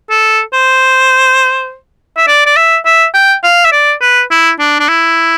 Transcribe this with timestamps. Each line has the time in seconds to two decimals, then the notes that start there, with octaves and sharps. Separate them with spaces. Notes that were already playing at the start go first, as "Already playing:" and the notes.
0.10 A4
0.54 C5
2.17 E5
2.28 D5
2.46 D5
2.56 E5
2.86 E5
3.14 G5
3.44 F5
3.65 E5
3.72 D5
4.02 B4
4.31 E4
4.59 D4
4.80 D4
4.89 E4